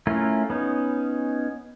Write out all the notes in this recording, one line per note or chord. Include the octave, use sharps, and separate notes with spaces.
A3 C#4 E4 F4 A#4
B3 C#4 D#4